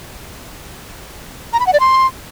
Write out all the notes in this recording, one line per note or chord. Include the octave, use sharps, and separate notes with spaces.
A#5
B5
F#5
D5
C6